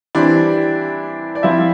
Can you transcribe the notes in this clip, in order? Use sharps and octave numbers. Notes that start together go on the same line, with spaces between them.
E3 G3 C4 D4 E4 D5
D5
F3 C4 E4 F4 E5